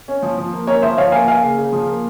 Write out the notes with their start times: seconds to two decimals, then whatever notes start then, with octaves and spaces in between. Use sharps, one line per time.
0.08 C#4
0.23 F3
0.37 F3
0.53 A#3
0.67 C#4 A#4 C#5
0.82 F3 C5 E5
0.98 F3 C#5 F5
1.12 A#3 F5 G#5
1.28 A#3 F5 G#5
1.42 C#3
1.58 C#3
1.72 F3
1.87 A#3